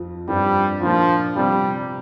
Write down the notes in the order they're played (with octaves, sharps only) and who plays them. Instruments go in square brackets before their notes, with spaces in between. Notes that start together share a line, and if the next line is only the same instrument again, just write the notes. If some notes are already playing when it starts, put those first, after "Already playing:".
Already playing: [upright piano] F2 F3 C4 F4
[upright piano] G2 F3 C4 [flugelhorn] G3
[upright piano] A#2 A#3 D4 F4 [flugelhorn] F3
[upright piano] C3 F3 C4 [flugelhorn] G3